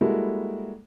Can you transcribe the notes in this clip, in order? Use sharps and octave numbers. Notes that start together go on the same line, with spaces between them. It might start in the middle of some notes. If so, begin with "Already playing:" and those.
G3 G#3 A#3 E4 F#4 A4